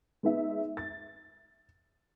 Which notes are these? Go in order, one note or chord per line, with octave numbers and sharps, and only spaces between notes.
G#3 B3 D#4 E5
A6